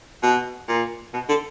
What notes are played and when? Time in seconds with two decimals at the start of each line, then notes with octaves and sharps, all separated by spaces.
0.23 B2
0.68 A#2
1.14 B2
1.29 D3